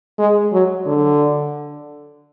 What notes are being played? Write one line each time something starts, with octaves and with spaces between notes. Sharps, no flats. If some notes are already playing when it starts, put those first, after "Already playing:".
G#3
F#3
D3